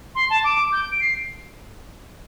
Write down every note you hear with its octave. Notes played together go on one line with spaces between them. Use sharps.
C6
A5
D6
G6
D7
C7